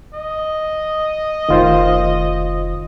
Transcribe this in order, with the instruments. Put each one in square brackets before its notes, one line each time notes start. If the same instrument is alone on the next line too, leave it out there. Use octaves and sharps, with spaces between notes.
[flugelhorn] D#5
[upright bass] F1 [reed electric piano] D#3 F4 C5